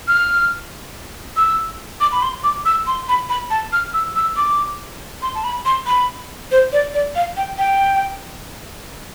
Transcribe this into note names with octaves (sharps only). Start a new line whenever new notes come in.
F6
E6
D6
B5
C6
D6
E6
C6
B5
B5
A5
F6
E6
E6
D6
C6
A5
B5
C6
B5
C5
D5
D5
F5
G5
G5